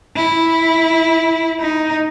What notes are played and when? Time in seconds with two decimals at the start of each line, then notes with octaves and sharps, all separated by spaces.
0.16 E4
1.60 D#4